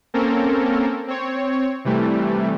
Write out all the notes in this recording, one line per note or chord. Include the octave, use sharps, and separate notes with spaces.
A#3 C4 C#4 A4 A#4
C4 C#5
C3 E3 G3 A3